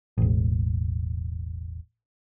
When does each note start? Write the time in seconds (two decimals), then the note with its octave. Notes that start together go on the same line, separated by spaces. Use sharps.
0.18 E1 A1